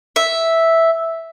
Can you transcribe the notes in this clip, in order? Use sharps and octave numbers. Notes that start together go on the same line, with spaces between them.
E5